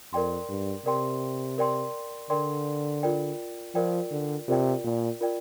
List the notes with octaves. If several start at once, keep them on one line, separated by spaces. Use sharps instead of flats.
F2 A#4 D5 G5 C6
G2
C3 A#4 D5 G5 C6
A#4 D5 G5 C6
D3 A#4 D5 G5 C6
F4 A#4 D5 G5
F3 F4 A#4 D5 G5
D3
C3 F4 A#4 D5 G5
A#2
F4 A#4 D5 G5